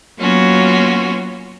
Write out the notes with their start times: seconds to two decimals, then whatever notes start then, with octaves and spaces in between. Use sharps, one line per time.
0.18 F#3 A#3 B3 C#4 F4 F#4